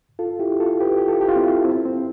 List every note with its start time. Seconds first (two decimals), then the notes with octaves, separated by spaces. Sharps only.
0.19 F4 A4
0.39 E4 G4
0.60 F4 A4
0.81 G4 B4
0.97 G4
1.08 F4 A4
1.21 G4
1.28 F4
1.36 C4 E4
1.64 C4 E4
1.85 C4